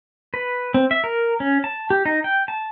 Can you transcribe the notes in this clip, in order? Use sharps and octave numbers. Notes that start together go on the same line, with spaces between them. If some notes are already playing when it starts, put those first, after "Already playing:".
B4
C4
E5
A#4
C#4
A5
G4
D#4
G5
A5